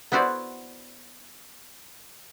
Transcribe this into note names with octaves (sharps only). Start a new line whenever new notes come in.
B3 E4 F#4 C5 D5